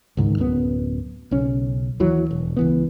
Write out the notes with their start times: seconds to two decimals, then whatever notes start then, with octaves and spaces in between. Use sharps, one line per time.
0.17 C#2 G#2 D#3
0.38 D1 F#2 B3
1.31 B1 C#3 C#4
2.00 D#2 E3 F#3
2.31 E1
2.57 C#2 E3 B3